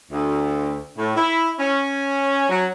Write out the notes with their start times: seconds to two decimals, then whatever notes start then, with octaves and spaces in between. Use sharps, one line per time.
0.10 D2
0.97 A2
1.16 E4
1.59 C#4
2.49 F#3